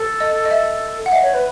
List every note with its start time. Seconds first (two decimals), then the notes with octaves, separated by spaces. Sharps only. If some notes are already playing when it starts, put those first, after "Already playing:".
Already playing: A4
0.20 D#5
0.45 D#5
0.51 E5
1.06 F#5
1.12 D#5 E5
1.22 C#5
1.34 B4